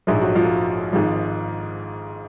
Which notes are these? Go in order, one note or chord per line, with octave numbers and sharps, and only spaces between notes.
A#1 G#2 F3
F#3 F#4
F3 F4
G#1 G#2 F3